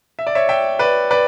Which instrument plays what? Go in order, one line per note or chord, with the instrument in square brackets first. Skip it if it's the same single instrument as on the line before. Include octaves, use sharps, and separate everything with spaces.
[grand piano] E5
D5
C#5 E5
E5 G5
B4 D5
B4 D5